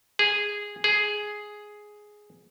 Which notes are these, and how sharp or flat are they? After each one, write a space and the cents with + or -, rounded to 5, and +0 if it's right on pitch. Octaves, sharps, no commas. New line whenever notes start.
G#4 -10
G#4 +5